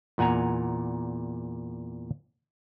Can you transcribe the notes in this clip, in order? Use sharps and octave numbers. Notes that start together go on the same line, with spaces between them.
E2 A#2 F#5 G#5 A#5